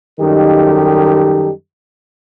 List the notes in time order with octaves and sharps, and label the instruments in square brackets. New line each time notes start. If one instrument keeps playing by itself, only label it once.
[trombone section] F#2 D#3 G3 D#4 G4 A4